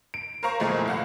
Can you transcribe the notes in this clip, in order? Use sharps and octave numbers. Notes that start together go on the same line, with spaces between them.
D7
A#4 C5 F5 A#5 C#6
E2 A#2 F3 G#3 A3
C2 F5 F#5